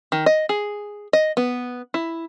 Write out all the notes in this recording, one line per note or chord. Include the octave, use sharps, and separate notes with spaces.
D#3
D#5
G#4
D#5
B3
E4